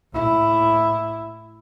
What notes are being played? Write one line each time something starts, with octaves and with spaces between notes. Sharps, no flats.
A2 E4